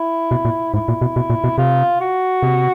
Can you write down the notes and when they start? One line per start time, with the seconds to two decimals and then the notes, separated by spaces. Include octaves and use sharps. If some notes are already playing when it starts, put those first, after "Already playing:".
Already playing: E4
0.31 B2
0.45 A#2
0.74 G#2 E4
0.88 A#2
1.01 B2
1.16 B2
1.30 A#2
1.44 B2
1.58 C3 F4
2.01 F#4
2.43 C3